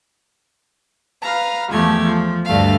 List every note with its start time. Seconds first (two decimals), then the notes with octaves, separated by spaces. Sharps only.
1.23 B4 F5 A#5
1.70 E2 F3 A3 G4 G#6
2.03 F3
2.46 D2 G2 A3 F5